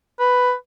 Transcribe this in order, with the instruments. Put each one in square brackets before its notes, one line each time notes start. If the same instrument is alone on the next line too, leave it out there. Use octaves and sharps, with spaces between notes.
[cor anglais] B4